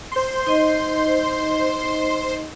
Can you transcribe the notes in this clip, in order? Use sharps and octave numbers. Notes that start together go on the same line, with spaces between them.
C5 C6
D#4 D#5